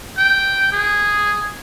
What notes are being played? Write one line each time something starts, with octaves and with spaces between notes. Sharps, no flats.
G5
G#4